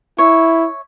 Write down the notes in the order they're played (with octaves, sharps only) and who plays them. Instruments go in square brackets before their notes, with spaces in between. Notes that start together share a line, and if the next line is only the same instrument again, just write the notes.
[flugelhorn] E4 [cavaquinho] C#5 E5